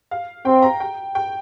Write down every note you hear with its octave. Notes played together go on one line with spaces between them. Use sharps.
F5
C4 G5
A#5
G5
G5